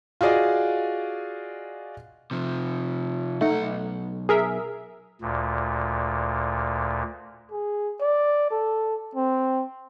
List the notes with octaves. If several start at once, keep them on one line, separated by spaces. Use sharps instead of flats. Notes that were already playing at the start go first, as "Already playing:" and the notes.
F4 F#4 G#4 D5 D#5
C3 F3
B1 A3 D#4 F#5
G#4 A#4 E5
D2 A#2
G#4
D5
A4
C4